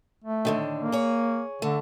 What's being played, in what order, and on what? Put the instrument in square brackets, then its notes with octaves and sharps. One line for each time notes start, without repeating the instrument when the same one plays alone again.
[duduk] A3
[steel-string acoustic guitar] A2 D3 D#3
[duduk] A#3
[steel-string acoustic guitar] G#4 C#5
[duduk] D3 [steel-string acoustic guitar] A3